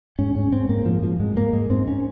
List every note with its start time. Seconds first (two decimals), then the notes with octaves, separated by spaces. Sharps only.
0.19 G#2 C#4
0.35 G#2 C#4
0.52 G#2 C4
0.69 G#2 A#3
0.86 G#2 F3
1.03 G#2 F3
1.20 G#2 G#3
1.36 G#2 A#3
1.53 G#2 G#3
1.70 G#2 C4
1.88 C#4